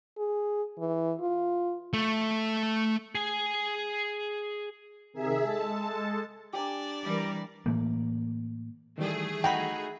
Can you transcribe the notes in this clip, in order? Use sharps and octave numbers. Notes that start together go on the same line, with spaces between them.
G#4
E3
F4
A3
G#4 G#5
C3 D#3 G#4 A#4 E5
G#3 A4 A5
D4 G4 D5 G#5 A#5
E3 G3 A#4
A2 E3 A3 A#3
D#3 E3 G3 A3 G#4
D#4 F#4 G5 B5